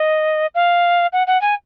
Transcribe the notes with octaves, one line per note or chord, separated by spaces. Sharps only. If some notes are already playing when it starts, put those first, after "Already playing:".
Already playing: D#5
F5
F#5
F#5
G#5